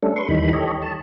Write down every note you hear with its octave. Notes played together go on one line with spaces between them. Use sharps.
G3 A3 C#4 D4 A4
B4 C6 C#6
D#2 D#3 E3 G3 D#4 B5
G4 A4 C#5 D#5
A5